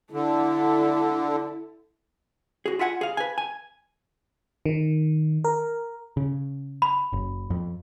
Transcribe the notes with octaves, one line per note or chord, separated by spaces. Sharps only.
D3 E4 A4
F#4 G#4
F4 E5 F#5 G#5
G#4 F5
B4 G#5
G#5
D#3
A#4
C#3
B5
F#1
F2